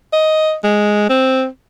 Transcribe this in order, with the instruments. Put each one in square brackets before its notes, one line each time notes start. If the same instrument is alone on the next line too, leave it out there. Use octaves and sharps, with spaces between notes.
[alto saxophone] D#5
G#3
C4